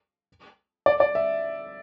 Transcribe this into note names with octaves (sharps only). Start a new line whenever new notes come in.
D5
D5
E5